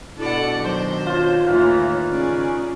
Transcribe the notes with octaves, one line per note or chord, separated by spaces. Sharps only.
B2 D4 E4 A4 D5 F#5
D#3 F#3 C5
F4 C#5
D#2 A2 E3 D#4 F4 B4
C#3 C#4 G#4 D5